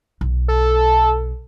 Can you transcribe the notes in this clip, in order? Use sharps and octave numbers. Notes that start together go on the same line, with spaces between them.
B1
A4